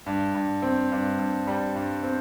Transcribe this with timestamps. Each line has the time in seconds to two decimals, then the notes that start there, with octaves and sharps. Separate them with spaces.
0.06 G2
0.34 G2
0.62 C4
0.92 G2
1.19 G2
1.47 G3
1.75 G2
2.03 C4